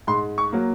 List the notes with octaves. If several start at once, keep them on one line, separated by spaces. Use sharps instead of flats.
G#2 C6
C#6
F#3 A#3